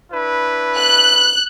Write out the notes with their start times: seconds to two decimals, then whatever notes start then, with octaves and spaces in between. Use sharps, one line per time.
0.12 D4 E4 B4
0.76 F#6